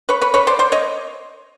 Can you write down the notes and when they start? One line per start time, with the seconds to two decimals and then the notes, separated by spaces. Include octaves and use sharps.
0.09 B4 C#5
0.21 B4 C#5
0.34 B4 C#5
0.47 C5 D5
0.59 C5 D5
0.72 C#5 D#5